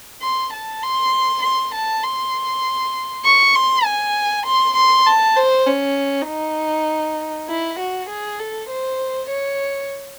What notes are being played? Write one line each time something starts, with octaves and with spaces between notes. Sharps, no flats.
C6
A5
C6
C6
A5
C6
C#6
C6
G#5
C6
C6
A5
C5
C#4
D#4
E4
F#4
G#4
A4
C5
C#5